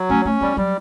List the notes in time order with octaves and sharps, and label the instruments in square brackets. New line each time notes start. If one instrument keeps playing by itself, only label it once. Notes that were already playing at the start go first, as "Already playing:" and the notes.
Already playing: [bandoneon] F#3
[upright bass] A3 [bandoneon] C#4
[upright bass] A3 [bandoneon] C#4
[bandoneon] G3 [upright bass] B3
[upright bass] F#3 [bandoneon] G3